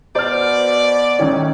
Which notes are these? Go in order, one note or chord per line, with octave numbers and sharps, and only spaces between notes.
B2 C5 D5 F6
A1 D#3 C#4